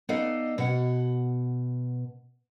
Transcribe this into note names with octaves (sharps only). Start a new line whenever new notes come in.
B3 D#4 A4 D5 D#5 F5
B2 F#5